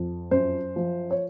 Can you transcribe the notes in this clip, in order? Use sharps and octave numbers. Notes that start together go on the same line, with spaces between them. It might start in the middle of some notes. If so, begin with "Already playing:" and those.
Already playing: F2
F#2 C5
F3
C#5